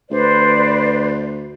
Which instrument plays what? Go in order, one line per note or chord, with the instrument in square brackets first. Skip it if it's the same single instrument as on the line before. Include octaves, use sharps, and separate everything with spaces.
[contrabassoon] D2 [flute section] B4 C5 D5